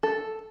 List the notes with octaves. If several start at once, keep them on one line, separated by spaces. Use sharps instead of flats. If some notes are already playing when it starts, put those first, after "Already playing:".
A4